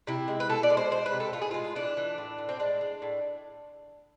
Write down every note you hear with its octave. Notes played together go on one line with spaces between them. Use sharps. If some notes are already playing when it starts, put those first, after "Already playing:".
C3 E4
G#3
B4
B2 A4
D5
G#3
C5
G#3 C5
B4
C3
A4
A2 F4
G#4
G#3 F4
E3 D4
E3
A2
A2
C4
G#3 D4
G#3
A2